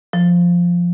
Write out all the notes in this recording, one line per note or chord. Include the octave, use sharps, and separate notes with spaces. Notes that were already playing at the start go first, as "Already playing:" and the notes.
F3